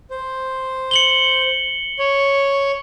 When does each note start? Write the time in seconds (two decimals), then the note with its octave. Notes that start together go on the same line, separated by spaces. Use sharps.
0.10 C5
0.91 C#7 F#7 G7
1.99 C#5